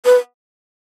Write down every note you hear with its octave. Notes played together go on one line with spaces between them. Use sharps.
B4